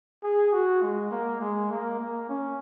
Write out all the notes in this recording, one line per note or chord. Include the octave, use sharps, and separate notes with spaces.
G#4
F#4
G#3
A#3
G#3
A#3
A#3
C#4